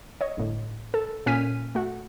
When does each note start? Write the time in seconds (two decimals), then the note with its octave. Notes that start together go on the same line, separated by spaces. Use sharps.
0.21 C#5 D#5
0.37 G1 A2
0.94 A4
1.26 A#2 C#4 G#5 F6 B6 D#7
1.75 A3 F#4